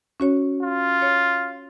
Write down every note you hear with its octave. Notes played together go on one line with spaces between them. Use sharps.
C#4 F#4 C#5
F4
C#5